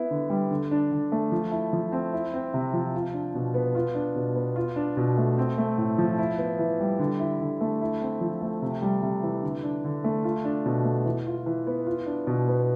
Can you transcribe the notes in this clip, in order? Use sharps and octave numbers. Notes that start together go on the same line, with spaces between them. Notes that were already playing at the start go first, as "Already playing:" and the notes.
Already playing: B3 E4
D3
G3
D3
D4
D3
A3
F3
E4
F3
C4
E4
C4
C3
F3
F4
D4
B2
B3
F4
D4
B2
B3
F4
D4
B2
A3
C4
A3
A2
F3
E4
B3
E3
G3
D3
E4
D3
A3
E4
C4
F3
A3
C3
G3
C3
E3
D3
D4
D3
A3
F4
D4
B2
A3
E3
F4
E3
B3
F4
D4
B2
B3